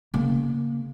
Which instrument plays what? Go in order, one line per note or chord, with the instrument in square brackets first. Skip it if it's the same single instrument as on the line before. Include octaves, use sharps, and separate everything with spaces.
[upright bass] C#3 A#3